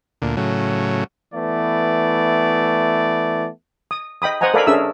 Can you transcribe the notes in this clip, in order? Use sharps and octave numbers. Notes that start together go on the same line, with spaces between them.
D2 A#2
A2 C#3 F#3
E3 A3 B3 D5
D#6
D#5 G5 B5 D#6
C5 D#5 F#5 G#5 A#5
A4 A#4 D5 F5 G#5 B5
C#4 D4 G#4 A#4 E5 E6